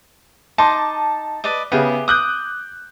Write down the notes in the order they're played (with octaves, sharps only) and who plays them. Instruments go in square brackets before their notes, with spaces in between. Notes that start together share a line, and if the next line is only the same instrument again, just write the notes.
[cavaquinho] D#4 C6 D6 [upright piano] A5
[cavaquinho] B4 D5 D#5
[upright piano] C#3 B3 [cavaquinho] G4 G#4 E5
[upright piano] D6 F#6 G6 [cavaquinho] D#6